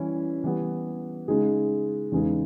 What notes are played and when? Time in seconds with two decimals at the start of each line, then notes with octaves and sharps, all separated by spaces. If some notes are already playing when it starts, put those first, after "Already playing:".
Already playing: E3 G3 C#4 E4
0.44 E3 G3 B3
1.28 C#3 G#3 D#4 G#4
2.12 E2 C#3 G#3 D#4 G#4